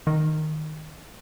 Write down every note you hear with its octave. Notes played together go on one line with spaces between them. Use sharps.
D#3